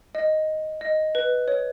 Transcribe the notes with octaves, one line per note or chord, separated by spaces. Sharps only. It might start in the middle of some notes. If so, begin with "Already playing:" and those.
D#5
D#5
B4
C#5